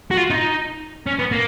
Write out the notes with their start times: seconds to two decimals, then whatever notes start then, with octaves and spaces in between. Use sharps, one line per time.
0.11 F#4
0.17 F4
0.30 D#4
1.06 C#4
1.19 B3
1.32 A#3